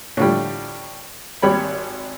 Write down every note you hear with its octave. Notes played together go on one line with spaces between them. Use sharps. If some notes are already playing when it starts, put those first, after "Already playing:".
A2 D3 F3 G3
G#1 G3 C#5 B5